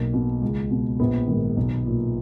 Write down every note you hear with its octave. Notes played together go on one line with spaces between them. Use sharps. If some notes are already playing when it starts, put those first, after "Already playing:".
Already playing: B1 A#3
B2
C#2
B2
A#1 B3
G#2 D#3
B1
A#2